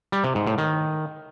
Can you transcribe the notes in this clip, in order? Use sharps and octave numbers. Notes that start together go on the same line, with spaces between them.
G3
C3
G#2
A2
D#3